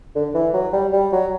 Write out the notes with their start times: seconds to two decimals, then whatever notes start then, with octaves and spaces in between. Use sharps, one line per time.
0.15 D3
0.34 E3
0.54 F#3
0.73 G3
0.93 G3
1.13 F#3